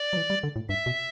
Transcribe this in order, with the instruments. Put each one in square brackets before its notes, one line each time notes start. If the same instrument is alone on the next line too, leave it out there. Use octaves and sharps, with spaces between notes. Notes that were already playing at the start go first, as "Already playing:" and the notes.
Already playing: [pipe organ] D5
[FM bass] F#3
E3
G3
D3
A2
[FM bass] G2 [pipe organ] E5
[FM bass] B2